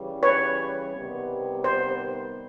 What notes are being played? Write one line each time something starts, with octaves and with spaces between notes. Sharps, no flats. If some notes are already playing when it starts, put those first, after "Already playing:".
Already playing: C#3 E3 G3
B4 C#5
C3 D#3 G3 B3
C5